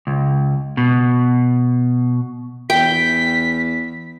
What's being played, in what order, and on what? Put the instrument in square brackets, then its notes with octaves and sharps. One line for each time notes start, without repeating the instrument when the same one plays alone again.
[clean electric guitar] C#2
B2
[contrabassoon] E2 [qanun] G5 [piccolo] B6